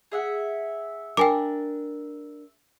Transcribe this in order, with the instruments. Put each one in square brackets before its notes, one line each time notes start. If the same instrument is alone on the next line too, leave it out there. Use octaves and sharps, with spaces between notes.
[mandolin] G#4 E5 F#5
[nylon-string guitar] D4 A#4 [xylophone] G5 G#5 D6